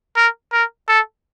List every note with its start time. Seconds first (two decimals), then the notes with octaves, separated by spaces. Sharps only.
0.17 A#4
0.53 A#4
0.88 A4